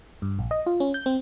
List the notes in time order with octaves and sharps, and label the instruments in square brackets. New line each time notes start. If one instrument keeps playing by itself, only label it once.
[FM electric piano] G2
A#1
D#5
F4
C#4
G6
C4